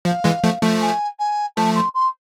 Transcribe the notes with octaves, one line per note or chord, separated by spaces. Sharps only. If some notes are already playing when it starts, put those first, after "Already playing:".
F3 F5
E3 G#3
F3 A3
F3 A3
G#5
G#5
F3 A3 A5
C6
C6